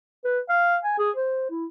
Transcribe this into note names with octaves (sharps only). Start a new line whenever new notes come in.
B4
F5
G#5
G#4
C5
E4